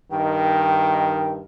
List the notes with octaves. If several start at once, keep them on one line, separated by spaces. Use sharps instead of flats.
G2 D#3 G5